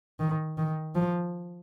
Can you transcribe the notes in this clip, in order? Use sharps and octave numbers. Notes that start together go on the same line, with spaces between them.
D#3
D#3
F3